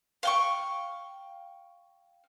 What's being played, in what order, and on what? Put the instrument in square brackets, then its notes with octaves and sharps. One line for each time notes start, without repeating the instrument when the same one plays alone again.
[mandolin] F5 G5 C#6